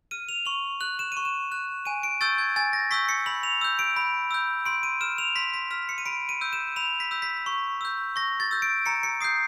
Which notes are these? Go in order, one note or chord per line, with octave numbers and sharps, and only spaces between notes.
F6 D#7
F7
C#6 F#7
F#6 F#7
E7
C#6 D#7
E7
F#6
G#5 D#7
D7
C#6 E6 G6 A6
G#6
G#5 A6
A#6
C#6 E6 G6 B6
C#7
B5 F#7
F7
E6 G6
D7
B5
E6 G6
C6 D7
D#7
F6 E7
F7
C6 B6
B6
F6 B6
C#7
D#7
B5 D7
D#7
E6 G6
E7
B5 F7
B6
E6 G6
B6
C#6
E6 G6
C#6 A#6
A6
E6 G6
D7
A#5 C#7
C#7
D#6 G6 C7